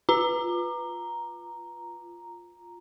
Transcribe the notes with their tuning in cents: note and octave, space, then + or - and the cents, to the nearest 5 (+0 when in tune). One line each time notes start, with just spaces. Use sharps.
F4 +0 A#5 +0